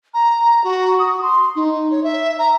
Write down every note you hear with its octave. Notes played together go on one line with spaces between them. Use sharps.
A#5
F#4
D#6
C6
D#4
C#5
E5
A#5